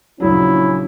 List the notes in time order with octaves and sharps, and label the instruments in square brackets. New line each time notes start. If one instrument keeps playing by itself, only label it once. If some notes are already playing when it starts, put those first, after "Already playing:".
[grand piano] A#1 C#3 F#3 [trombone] C#4 [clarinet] E4